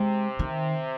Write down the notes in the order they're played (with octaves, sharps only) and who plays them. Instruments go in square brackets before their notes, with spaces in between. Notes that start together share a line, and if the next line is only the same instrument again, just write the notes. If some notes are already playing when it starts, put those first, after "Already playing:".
Already playing: [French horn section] C3 [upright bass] G#3
[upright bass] D#3